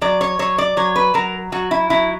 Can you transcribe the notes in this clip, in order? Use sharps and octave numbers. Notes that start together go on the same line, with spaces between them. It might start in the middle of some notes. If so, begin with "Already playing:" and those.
F#3 D5
C#5
F#3 C#5
D5
F#3 C#5
B4
F#3 A#4
F#3 F#4
E4
F#3 E4